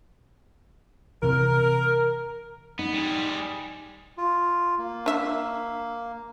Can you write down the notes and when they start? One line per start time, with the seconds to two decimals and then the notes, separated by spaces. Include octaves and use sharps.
1.23 C3 E3 A#4
2.79 B3 D#4
2.94 G3 G#4
4.17 F4
4.79 A#3
5.06 D4 E5